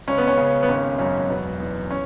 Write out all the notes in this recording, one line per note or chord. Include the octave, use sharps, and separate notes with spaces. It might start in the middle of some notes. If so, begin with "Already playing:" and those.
C#2 C#4
B3
C#4
C#3
B3
G#1 C#4
F#2 C#4
E1 B3
E2
C#4